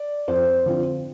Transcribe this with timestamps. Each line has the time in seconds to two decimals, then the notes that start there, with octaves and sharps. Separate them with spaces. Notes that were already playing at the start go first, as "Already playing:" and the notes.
Already playing: D5
0.28 F2 C5
0.66 D3 F3 C4